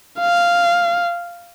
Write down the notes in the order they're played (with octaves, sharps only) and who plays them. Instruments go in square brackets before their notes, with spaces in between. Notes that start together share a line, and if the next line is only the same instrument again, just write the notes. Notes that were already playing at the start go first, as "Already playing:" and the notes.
[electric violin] F5